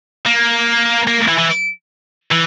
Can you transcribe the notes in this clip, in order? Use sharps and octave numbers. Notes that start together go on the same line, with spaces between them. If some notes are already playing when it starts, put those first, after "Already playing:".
A#3
A#3
E3
E3
E3